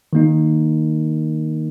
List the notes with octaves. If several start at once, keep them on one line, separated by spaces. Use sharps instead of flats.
D#3 A#3 D#4